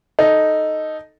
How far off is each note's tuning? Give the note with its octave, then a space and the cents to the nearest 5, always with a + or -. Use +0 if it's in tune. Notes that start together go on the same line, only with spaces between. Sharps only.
D#4 +0 A4 +0